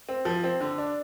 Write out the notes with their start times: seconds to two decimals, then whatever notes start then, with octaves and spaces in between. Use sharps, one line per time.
0.09 C4
0.25 F3
0.44 C4
0.60 D3
0.78 D4